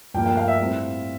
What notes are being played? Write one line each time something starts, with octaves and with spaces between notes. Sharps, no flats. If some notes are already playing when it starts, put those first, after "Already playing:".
G2 F3 A#3 G5
G5
F5
E5
A2 G3 C4